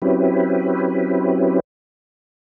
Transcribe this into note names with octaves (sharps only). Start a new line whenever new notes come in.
F#3 C4 C#4 E4 G4 B4